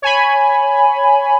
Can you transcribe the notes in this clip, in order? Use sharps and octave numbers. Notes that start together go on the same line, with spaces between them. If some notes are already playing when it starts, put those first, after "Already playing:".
C#5 G#5 B5